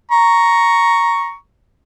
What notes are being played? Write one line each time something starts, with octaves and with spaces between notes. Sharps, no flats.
A#5 C#6